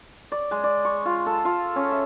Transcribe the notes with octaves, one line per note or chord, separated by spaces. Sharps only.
D5
G#3
D5
C#6
F4
A4
F4
C#4
E5